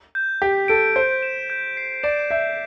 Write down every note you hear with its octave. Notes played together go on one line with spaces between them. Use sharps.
G6
G4 B6
A4 D7
C5 G6
E7
G6
C7
D5 E7
E5 G6